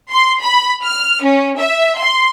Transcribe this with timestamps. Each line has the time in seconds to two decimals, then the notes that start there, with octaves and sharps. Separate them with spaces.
0.12 C6
0.44 B5
0.84 F6
1.24 C#4
1.57 E5
1.99 C6